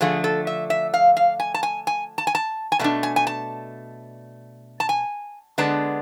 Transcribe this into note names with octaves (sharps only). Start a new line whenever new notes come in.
D3 F3 A3 G#4
A4
E5
E5
F5
F5
G#5
A5
G#5
G#5
A5
G#5
A5
G#5
B2 A3 D4 A5
G#5
G#5
A5
A5
G#5
D3 G#3 B3 D4 A5